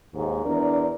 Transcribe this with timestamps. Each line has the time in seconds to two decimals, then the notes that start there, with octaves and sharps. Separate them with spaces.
0.14 D#2 G#2
0.44 E2 D4 A#4 D5